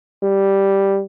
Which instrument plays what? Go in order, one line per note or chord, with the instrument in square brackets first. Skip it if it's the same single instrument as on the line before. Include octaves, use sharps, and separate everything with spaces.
[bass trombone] G3